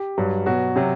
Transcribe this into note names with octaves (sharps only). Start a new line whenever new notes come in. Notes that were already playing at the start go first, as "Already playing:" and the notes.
Already playing: G4
G2 F#3
B2 F#3 F#4
C3 F#3